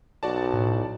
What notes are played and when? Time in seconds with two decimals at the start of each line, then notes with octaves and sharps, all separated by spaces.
0.23 B1 F#4 D5 A5
0.54 A2